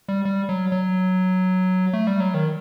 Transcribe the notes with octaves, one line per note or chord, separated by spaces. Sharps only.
G3
G3
F#3
F#3
A3
G3
F#3
D#3